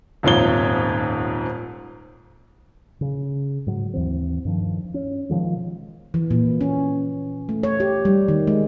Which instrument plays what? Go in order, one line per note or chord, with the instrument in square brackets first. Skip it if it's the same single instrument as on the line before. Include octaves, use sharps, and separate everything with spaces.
[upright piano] D#1 F2 G#2 C#5 G7
[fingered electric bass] C#3
G#2 F#3
D#2 E3 C4
G2 D#3 F3
C#4
B2 D#3 F3 G#3
[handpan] E3
A#2
C#4
A3
C#5
G4
G3
D#3
G#3